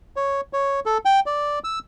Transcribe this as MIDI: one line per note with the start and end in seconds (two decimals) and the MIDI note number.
0.16 0.41 73
0.53 0.80 73
0.86 0.98 69
1.05 1.20 79
1.26 1.59 74
1.64 1.79 88